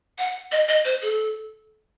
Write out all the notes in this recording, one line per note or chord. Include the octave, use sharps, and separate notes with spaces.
F#5
D#5
D#5
C5
A4